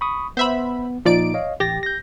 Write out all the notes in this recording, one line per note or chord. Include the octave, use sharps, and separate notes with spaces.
B5 C#6 D#6
B3 C5 E5 B5
A#2 F3 D#4 D5 D7
C#5 D#5 F5
A1 G4 A6 A#6
G6 A#6